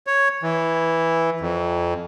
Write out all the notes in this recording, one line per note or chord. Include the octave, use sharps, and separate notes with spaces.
C#5
E3
F2